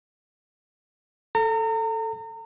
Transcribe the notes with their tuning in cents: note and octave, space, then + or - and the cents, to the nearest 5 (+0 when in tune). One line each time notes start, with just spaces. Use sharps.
A4 +0 A#5 -35